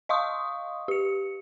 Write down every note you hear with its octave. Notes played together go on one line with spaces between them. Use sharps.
D#5 F5 C6 C#6 D#6
G4 C#7